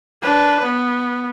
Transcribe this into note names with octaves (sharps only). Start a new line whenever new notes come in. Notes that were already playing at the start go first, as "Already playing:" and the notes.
D4 B4
B3